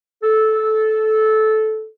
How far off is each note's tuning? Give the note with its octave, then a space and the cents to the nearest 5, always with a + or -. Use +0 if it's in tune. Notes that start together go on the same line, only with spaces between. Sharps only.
A4 -15